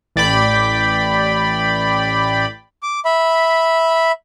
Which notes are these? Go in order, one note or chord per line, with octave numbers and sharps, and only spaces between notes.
A1 D5 G5 B5
D6
E5 B5